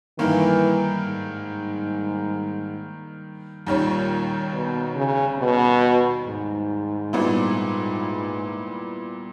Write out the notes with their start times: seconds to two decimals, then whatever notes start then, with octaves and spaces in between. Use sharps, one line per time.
0.19 G2 D#3 E3 A#3
1.06 G#2
3.66 D#2 A#2 D#3 G3 C#4
4.53 B2
4.96 C#3
5.39 B2
6.26 G#2
7.13 A#2 G3 B3 E4